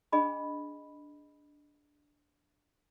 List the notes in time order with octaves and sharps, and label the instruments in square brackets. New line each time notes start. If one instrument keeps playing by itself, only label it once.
[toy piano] D4 G#4 D#5 G#5 B5